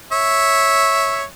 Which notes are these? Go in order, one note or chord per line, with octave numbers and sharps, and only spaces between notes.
C#5 E5